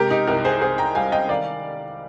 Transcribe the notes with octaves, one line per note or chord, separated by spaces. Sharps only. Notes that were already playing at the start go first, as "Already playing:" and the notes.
Already playing: C3 G#3 G4 A#4
D#4 G4
C2 G4 A#4
G#4 C5
C2 G#4 C5
G5 A#5
G3 F5 G#5
D#5 G5
D#3 D5 F5